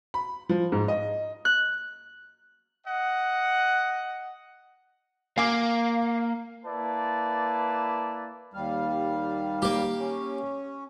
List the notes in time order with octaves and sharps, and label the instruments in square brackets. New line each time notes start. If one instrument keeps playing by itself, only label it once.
[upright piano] B5
F3
G#2
D#5
[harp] F#6
[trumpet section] D#5 F#5
[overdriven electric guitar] A#3 [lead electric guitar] F5 [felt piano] G#5 D6
[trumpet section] A#3 E4 B4 D5 A5
[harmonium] D#2 G3 F5
[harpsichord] A#3 G4
[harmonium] C#4